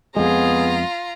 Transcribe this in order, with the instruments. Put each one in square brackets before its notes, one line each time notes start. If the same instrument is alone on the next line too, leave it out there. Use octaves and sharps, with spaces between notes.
[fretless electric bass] F2 G#3 [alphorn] B3 [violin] F4 A#5 [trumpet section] G#4